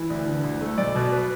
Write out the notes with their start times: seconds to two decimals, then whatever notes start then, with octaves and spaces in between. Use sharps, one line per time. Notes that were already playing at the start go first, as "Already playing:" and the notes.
Already playing: E3
0.10 D2
0.26 D3
0.44 D2
0.61 A3
0.78 B1 D5
0.95 B2
1.12 B4